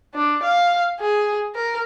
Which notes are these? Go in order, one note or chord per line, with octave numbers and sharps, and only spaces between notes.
D4
F5
G#4
A#4